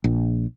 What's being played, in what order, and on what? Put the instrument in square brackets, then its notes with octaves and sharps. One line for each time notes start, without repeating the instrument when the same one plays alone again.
[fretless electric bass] A#1